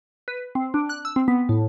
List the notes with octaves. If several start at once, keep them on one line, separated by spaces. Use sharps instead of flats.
B4
C4
D4
F#6
E6
C4
B3
A2